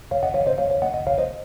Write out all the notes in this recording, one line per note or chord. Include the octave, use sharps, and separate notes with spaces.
C#5 F5
D#5 F#5
C#5 F5
C5 D#5
C#5 F5
C#5 F5
D#5 F#5
D#5 F#5
C#5 F5
C5 D#5